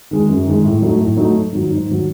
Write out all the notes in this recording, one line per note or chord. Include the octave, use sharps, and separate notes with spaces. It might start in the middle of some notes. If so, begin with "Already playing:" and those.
D#3 G#3
F#2
D#3 G#3
A2
F#3 A3 D#4
A2
F#3 A3 D#4
G#2
D#3 F#3
G#2
D#3 F#3